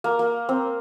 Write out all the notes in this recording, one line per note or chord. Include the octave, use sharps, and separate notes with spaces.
A#3
A#3
C4